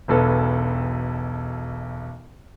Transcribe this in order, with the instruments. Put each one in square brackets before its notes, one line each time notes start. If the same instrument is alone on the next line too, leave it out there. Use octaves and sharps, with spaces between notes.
[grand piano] E1 B1 A4 B4